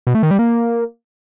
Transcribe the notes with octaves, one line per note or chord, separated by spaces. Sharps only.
B2
A3
D#3
G3
A#3